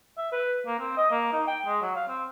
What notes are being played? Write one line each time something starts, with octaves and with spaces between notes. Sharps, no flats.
E5
B4
A#3
C4
D#5
A#3
D#4
G5
G#3
F#3
F5
C4